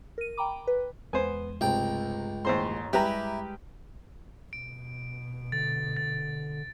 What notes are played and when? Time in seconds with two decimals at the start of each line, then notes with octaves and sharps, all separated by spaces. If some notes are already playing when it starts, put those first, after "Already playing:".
0.18 A#4 D#7
0.38 G5 A#5 B5 D6
0.67 B4
1.13 E2 G#3 B3 C5 G#5
1.61 C#2 G2 C3 A3 G5
2.45 A1 D#2 G#4 C5 A#5 C6
2.93 G3 G#3 E4 G4 B4 A#5
4.53 B2 D7
5.52 D3 A6
5.97 A6